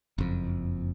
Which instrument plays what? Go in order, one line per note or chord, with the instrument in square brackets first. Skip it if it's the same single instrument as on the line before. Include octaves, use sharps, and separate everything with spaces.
[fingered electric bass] F#1 F2